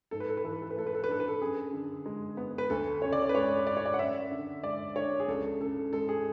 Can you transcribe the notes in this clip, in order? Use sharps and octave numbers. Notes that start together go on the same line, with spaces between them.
G#2 A4
B4
A4
B4
E3 A4
B4
A4
B4
A3 A4
B4
A4
B4
D4 A4
B4
A4
F#2 G#4
D3
G#3
B3
B4
D2 A4
C#3 C#5
D5
C#5
B4
G#3 C#5
C#4 D5
C#5
D5
F#5
F#2 E5
D3
G#3 D5
D4 C#5
G#4
C#2 A4
C#3 A4
G#3 A4
G#4